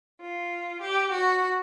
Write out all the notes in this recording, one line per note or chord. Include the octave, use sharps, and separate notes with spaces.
F4
G4
F#4